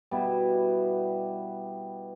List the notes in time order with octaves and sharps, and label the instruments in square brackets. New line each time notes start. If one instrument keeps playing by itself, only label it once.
[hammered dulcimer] B2 G3 B3 E4